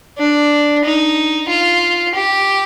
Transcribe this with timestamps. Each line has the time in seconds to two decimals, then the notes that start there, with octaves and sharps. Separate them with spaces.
0.18 D4
0.84 D#4
1.49 F4
2.15 G4